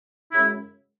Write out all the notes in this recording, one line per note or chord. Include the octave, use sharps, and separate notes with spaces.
F#2 C#3 G#3 C#4 E4